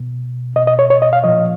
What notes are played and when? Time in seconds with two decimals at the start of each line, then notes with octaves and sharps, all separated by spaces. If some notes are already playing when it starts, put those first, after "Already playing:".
Already playing: B2
0.56 B2 D#5
0.67 D#5
0.79 C#5
0.90 C#5
1.02 D#5
1.13 F5
1.24 A#2 F3 D#5